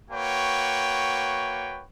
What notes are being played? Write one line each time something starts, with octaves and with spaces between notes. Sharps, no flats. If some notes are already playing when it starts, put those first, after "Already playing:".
A#3 F#4 B4 C#5 G5